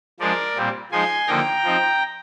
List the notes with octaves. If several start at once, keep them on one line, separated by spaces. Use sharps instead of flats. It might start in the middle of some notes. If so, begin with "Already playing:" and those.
F3 G#3 D4 A#4 D5
A#2 G3 C4
F3 G#3 D#4 G#5 C6
D3 F3 A#3 D#4 G5 A#5
F3 C4 D#4